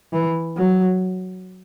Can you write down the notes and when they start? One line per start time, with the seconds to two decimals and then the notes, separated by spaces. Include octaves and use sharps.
0.13 E3
0.57 F#3